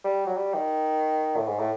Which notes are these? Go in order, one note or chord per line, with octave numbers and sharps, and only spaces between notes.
G3
F#3
G3
D#3
A2
G#2
A2